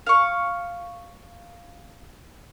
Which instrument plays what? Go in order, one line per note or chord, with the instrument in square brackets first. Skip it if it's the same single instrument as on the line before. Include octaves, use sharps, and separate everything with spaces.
[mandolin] F5 C#6